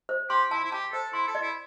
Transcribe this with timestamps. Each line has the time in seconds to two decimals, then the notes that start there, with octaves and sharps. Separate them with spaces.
0.09 C5
0.29 G4 C6
0.51 E4 A5
0.64 E4
0.71 G4 A5
0.93 A4 C5
1.13 E4 C6
1.27 A4
1.35 D5
1.42 E4